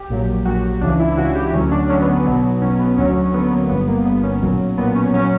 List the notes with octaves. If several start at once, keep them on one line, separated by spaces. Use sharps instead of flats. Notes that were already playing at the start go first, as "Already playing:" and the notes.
Already playing: G4
A#1 A#2 F#3
A#1 A#2 F#3 F#4
C#2 C#3 E3 D4
E4
E4
C#2 C#3 E3 F#4
G4
D2 D3 F#3 C#4
D4
D2 D3 F#3 C#4
B3
B3
B1 B2 F#3
B1 B2 F#3 C#4
B3
D2 D3 F#3 C#4
C#4
D2 D3 F#3 B3
B3
A#3
G1 G2 D3 B3
A#3
G1 G2 D3 B3
C#4
B1 A#2 F#3
B1 A#2 F#3 B3
C#4
A#2 F#3 C#4